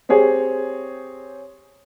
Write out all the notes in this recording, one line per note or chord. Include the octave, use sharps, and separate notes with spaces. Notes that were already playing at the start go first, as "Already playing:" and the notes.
C4 G4 G#4 C#5